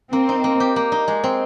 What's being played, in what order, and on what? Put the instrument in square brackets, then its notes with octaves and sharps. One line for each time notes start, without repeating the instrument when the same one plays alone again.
[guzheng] A#3 [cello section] C4
[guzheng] D#4
A#3
G4
A#3
D#4
G#3
C4